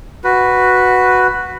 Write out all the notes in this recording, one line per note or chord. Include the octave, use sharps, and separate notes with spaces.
F#4 B4